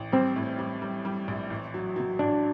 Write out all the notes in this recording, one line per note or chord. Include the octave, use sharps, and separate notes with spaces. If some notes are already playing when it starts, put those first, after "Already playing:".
Already playing: A1
G3 C4
A2
G3
G3
G3
A#1
A1
F#3
F#3
A1 D4